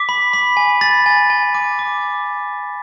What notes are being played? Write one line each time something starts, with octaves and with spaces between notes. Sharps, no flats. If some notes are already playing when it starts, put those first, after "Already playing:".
Already playing: D6 B6
B5
B5
G#5
B5 A6
G#5
G#5
D6
D6